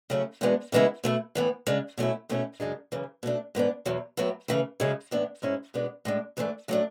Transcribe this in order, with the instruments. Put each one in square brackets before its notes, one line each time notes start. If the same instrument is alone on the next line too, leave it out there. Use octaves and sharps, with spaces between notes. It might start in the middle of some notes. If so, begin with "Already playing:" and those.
[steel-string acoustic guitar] C#3 F#3 A3 C#4 E4
E2 B2 G#3 B3 D4
C#3 E3 G#3 B3 E4
B2 A3 E4
A2 E3 B3
C#3 G#3 D4
B2 F#3 A3 C#4 E4
B2 A3 C#4 E4
F#2 C#3 G#3 D4
F#2 C#3 E3
B2 A3 D4
G#2 E3 B3 D4
E2 B2 F#3
A2 F#3 B3 E4
C#3 E3 A3 E4
F#2 C#3 G#3 C#4 E4
A2 E3 B3 D4
G#2 G#3 C#4 E4
B2 G#3 B3 D4
A2 G#3 D4
G#2 E3 A3 D4
A2 F#3 A3 D4